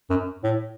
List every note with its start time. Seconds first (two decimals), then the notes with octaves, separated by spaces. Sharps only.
0.10 F#2
0.44 A2